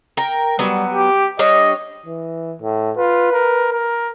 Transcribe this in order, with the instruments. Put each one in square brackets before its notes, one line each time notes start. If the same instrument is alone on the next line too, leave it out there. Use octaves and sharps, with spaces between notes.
[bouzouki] A#4 G5
[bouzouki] F#3 B3 [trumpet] G3
[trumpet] G4
[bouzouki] G3 D4 C#5 [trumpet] D#5
[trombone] E3
A2
[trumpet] F4 [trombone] B4
[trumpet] A#4
A#4